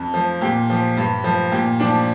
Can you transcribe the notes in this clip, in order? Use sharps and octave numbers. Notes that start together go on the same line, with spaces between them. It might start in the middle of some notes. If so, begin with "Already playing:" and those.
Already playing: F2
F3
A#2 G4
F3
G2
F3
A#2 G4
F3 D4